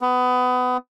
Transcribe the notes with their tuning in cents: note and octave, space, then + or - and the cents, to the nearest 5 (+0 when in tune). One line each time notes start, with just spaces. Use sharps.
B3 +25